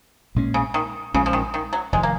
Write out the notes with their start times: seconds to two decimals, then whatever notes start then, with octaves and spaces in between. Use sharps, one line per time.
0.35 A#1 A#2 G#3 C#4
0.54 C#3
0.74 D#3
1.14 A#1 A#2 C#3 G#3 C#4
1.26 F3
1.33 D#3
1.54 D#3
1.73 F#3
1.92 F1 F2 D#3 G#3
2.03 A#3